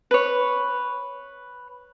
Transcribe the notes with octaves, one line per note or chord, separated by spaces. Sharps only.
B4 C#5